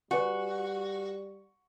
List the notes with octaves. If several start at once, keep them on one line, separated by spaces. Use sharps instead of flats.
G3 F#4 B4 D5 G#5